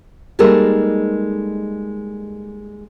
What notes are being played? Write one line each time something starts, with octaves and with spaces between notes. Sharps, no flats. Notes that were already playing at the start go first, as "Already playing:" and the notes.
G3 G#3 A#3 D#4 A4 A#4